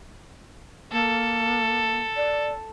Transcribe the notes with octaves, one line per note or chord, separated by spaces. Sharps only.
A#3 A4
D5